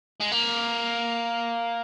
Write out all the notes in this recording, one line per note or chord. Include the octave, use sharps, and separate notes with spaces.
G#3
A#3